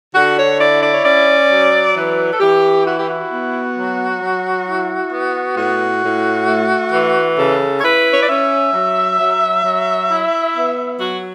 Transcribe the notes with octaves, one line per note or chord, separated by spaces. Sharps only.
D3 F#4
C#5
E4 D5
D5
C#5
C#4 D5
F#3
E3 B4
A4
E3 G4
E4 F#4
G4
F#4
B3
F#3
F#3
E4
B3
A2 F#4
A2
A3
E3
C#3 A4
C#5
E4 B4
C#5
D5
C#4 E5
F#3
F#3
F#3
E4
B3
F#3 F#4